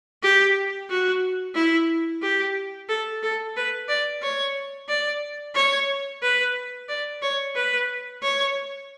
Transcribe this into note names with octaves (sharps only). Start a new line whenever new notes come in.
G4
F#4
E4
G4
A4
A4
B4
D5
C#5
D5
C#5
B4
D5
C#5
B4
C#5